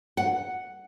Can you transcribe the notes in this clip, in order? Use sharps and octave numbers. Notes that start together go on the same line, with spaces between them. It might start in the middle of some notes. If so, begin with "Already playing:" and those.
F#5